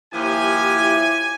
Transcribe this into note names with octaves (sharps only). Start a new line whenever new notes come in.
D#2 F3 E4 G4 G#5